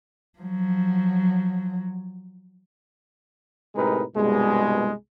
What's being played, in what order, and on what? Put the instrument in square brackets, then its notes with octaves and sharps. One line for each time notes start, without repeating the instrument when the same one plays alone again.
[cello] F3 F#3
[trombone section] A2 C3 G#3 D#4 A#4 B4
C2 G2 B2 G#3